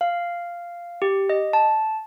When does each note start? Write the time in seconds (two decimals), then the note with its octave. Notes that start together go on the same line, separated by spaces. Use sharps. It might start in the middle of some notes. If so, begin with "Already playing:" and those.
0.01 F5
1.02 G4
1.29 D#5
1.53 A5